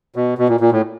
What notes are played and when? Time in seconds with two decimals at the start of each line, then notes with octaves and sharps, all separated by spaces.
0.16 B2
0.38 B2
0.49 A#2
0.60 A#2
0.71 A2